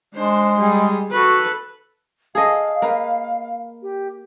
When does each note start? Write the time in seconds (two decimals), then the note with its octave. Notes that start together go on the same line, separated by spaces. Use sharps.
0.15 G#3 D4 C5
0.59 G3 G#4
1.11 F#4 A4 B4
2.35 G#4 A4 D#5 F5
2.82 A#3 B4
3.82 G4